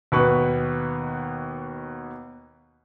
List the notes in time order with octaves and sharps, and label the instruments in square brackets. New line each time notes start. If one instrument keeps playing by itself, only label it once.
[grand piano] D#2 B2 B3 B4 C#6